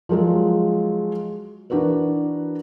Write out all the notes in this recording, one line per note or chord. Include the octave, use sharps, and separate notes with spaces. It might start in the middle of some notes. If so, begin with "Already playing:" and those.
F3 F#3 G#3 G#4
E3 D4 F#4 A#4 B4